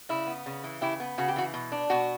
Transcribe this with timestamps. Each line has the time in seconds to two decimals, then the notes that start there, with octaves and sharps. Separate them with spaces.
0.09 C#3 E4
0.27 B3
0.46 C#3
0.64 E3
0.81 C#3 E4 G4
1.00 B3
1.18 C#3 F#4
1.28 G4
1.36 E3 F#4
1.54 B2
1.72 D4
1.90 B2 F#4